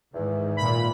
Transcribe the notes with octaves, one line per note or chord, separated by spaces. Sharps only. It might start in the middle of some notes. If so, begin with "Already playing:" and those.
E2 G#2 D#3 E3
A#2 B5